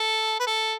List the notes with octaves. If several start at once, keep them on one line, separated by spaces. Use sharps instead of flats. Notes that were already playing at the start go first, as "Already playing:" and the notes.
Already playing: A4
B4
A4